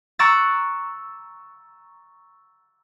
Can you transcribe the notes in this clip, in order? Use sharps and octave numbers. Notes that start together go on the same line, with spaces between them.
A#5 C#6 D6 E6 F#6 A6